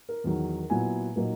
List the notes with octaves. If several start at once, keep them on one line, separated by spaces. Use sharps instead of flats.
A#4
E2 D#3 F#3
A#2 F#3 B3 E4 G#5
A#2 F#3 A#3 D#4